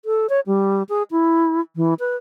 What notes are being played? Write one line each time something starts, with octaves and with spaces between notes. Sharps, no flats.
A4
C#5
G3
G#4
E4
E3
B4